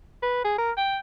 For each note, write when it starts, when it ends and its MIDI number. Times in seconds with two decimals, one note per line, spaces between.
0.22 0.40 71
0.44 0.56 68
0.58 0.71 70
0.77 0.98 79